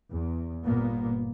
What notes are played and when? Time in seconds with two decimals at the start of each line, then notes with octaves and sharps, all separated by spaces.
0.11 E2
0.65 G1 A#2 A#3 B3